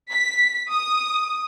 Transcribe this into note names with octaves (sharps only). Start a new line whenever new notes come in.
B6
D#6